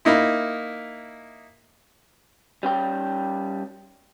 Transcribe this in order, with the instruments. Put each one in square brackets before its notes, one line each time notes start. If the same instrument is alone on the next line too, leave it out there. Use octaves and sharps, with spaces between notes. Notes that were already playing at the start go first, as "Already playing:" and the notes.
[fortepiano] A#3 D#4 E4
[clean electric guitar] G3 C#4 G5